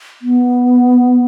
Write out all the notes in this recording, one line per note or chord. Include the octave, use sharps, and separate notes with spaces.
B3